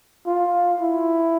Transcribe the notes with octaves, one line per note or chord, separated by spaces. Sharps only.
F4
E4